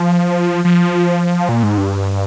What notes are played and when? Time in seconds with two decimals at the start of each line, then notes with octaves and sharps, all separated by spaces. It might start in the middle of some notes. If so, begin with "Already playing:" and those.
Already playing: F3
0.65 F3
1.49 A#2
1.63 G#2
1.78 G2